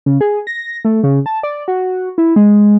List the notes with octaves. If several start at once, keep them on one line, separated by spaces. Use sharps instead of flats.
C#3
G#4
A#6
A3
C#3
A5
D5
F#4
E4
G#3